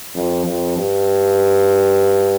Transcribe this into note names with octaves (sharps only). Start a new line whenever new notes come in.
F2
F2
G2